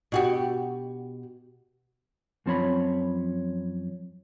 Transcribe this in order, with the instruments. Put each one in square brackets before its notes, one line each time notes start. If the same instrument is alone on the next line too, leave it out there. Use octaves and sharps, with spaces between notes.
[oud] B2 F#4 G4
[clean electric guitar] F#2 F3 C4 A4 C#5 B5